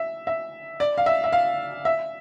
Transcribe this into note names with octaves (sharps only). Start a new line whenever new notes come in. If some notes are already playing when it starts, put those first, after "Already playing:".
Already playing: E5
E5
D5
F5
E5
E5
F5
E5